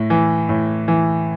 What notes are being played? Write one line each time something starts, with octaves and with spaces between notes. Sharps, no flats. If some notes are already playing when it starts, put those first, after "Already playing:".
Already playing: A2
E3
A2
E3